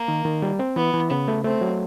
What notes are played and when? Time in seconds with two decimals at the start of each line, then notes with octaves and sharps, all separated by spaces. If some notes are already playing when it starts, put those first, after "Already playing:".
Already playing: A#3
0.08 D#3
0.25 D#3
0.42 G3
0.59 C4
0.76 E3 B3
0.94 E3
1.10 C#3 B3
1.28 A3
1.44 A3 C4
1.61 F#3